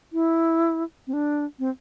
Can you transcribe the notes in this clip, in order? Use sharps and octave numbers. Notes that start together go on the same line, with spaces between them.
E4
C4
D4
C4